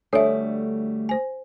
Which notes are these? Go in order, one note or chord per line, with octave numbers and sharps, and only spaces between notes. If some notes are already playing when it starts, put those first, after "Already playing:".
D2 G3 A3 D4 A4 C#5 D5 E5
C5 G#5